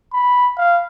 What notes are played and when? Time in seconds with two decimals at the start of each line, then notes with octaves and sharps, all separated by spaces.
0.13 B5
0.57 F5